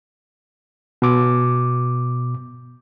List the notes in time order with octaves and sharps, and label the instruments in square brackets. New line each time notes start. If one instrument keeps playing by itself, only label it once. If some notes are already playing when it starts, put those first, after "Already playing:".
[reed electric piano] B2 D6